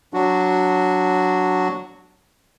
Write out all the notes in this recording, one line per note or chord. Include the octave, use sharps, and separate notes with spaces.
F#3 D4 F#4